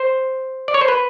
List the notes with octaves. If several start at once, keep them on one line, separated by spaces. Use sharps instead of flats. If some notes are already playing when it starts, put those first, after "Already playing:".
Already playing: C5
D5
C#5
C5
B4